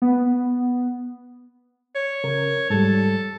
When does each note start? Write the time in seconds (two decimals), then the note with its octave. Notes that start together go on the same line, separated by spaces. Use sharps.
0.02 B3
1.95 C#5
2.24 C#3 A#4
2.70 G#2 G3 A4